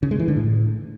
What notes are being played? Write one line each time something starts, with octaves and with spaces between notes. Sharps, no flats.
C#3
G#3
E3
D3
A2